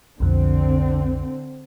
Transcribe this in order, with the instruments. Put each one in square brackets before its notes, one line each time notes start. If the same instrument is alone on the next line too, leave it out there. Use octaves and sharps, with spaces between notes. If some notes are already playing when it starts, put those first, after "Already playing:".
[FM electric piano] B1 F2 [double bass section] D3 C4